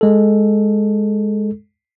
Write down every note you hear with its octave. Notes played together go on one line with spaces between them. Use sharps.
G#3 A4